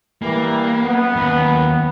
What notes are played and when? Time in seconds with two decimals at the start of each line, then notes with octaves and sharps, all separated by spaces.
0.22 E3 G3 A#3
0.83 F#2 B3
1.15 D#2